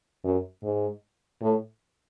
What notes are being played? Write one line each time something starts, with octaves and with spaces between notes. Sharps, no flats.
F#2
G#2
A2